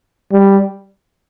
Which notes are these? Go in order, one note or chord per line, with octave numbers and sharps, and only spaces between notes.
G3